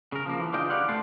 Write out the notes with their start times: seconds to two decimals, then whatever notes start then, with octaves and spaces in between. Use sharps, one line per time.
0.12 C#3 A#4
0.26 F3 A#3
0.40 E3
0.53 C#3 D4 F4 D5 D#5 G5
0.70 G4 B4 C#5 D5 F5 F#5
0.88 G2 C3 G3 A3 A5 C6